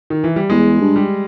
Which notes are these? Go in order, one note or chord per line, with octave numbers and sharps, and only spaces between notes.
D#3
E3
G3
E2 G#3
G2
G3